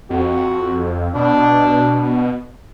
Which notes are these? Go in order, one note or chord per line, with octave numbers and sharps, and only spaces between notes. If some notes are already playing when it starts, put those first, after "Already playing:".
F2 F#4
B2 D4